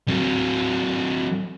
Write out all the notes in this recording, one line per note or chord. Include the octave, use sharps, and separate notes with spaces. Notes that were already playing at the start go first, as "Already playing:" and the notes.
F#3 C4